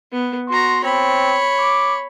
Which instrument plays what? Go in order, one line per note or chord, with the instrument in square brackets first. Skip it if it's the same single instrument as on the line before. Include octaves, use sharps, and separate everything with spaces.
[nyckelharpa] B3
[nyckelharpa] F#4 A#5 [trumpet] C6
[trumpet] C4 [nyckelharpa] C#5 B5
[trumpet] D6